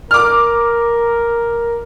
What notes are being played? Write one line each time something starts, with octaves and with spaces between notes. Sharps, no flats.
A#4 D6 F6